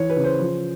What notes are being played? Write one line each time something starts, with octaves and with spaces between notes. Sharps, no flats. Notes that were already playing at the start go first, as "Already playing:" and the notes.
Already playing: E3 C#5
B4
C#3
C5
F3